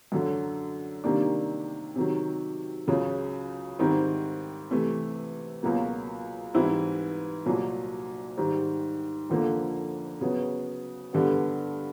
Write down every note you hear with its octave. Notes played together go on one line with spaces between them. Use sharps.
F#2 D3 F#3
C3 D#3 G3 A#3 D4
C3 D#3 F#3
C#2 C#3 F#3
G#2 D#3 G3 C4 E4
C3 E3 A3
C#2 B2 F#3 A#3
G#2 E3 G3 C4 E4
C2 A#2 F#3
G#2 D#3 G3
F2 D3 F3 A#3
C#3 F#3 B3
G2 D3 G3 B3